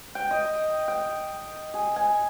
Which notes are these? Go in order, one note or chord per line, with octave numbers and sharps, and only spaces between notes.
G5
D#5
G5
G#4
G#5